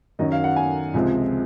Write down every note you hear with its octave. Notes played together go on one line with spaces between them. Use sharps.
F#2 D#3 F#3 C#4 D#5
F5
F#5
G#5
C#2 C3 F3 G#3 C4